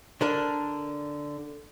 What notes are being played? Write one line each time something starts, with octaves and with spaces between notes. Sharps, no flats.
D3 D4 A#4